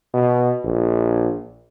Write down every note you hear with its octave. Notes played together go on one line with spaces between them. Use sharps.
B2
A#1